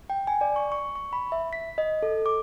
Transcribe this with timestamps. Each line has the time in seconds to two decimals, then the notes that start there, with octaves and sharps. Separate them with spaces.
0.10 G5
0.27 G#5
0.41 D5
0.56 C#6
0.72 C#6
0.96 C#6
1.13 B5
1.32 E5
1.53 B6
1.78 D#5
2.03 A4
2.26 D6